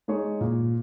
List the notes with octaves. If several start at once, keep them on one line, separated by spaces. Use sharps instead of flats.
G#3 D#4 G#4 C#5
A#2